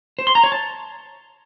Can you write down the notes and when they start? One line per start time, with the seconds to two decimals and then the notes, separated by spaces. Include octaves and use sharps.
0.19 C5
0.27 C6
0.35 A#5
0.44 C#5
0.52 A5